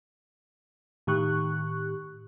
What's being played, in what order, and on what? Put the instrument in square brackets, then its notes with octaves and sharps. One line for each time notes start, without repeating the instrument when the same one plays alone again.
[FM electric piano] A2 D#3 G4 C#6 F#6